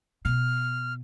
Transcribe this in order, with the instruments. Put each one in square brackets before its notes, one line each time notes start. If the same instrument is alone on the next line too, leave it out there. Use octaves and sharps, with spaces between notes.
[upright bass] B2 [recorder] F6